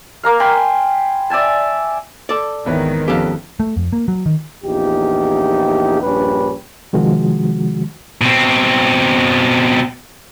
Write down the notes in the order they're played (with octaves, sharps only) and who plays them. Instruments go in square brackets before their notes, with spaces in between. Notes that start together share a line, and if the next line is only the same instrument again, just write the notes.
[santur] A#3 A#4 F5
G5 G#5 B5 C6
D5 E5 G#5 A5
[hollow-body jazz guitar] A4 D5
[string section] G#1 D#3 [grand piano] E2 B3 [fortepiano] E4 B4 C#5
[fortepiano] F2 B3 [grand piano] C#4 [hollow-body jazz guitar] G4 A4 F5
[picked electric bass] A3
F2
A#3
F#3
D#3
[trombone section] A#1 E2 D#4 F4 G4
A#1 G2 C#4 G4 B4
[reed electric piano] C3 D#3 F3 G#3 F#4
[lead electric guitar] B2 C4